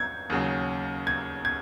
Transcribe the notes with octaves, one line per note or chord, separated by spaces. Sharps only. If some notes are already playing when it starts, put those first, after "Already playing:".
Already playing: G#6
D#2 C#3 F#3
G#6
G#6